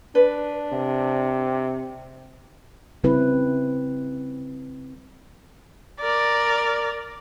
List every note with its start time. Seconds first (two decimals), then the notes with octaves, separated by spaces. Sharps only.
0.15 D4 B4
0.72 C3
3.04 C#3 G3 C4 E4 B4
6.00 A#4 D5